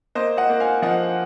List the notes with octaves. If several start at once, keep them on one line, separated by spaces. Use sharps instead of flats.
A#3 C5 D#5
D#5 F#5
A#3
F5 G#5
F3 D#5 F#5